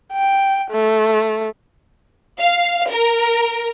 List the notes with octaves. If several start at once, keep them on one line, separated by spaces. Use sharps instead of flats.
G5
A3
F5
A#4